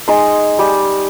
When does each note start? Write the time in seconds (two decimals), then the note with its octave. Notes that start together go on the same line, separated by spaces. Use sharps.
0.08 G#3 D#4 C6
0.59 G3